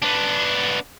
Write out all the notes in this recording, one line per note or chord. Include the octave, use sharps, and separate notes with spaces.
B3 D4